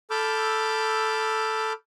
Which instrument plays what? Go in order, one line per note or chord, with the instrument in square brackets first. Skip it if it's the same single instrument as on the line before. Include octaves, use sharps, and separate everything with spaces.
[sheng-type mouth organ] A4 B5 D6 E6 F6 G6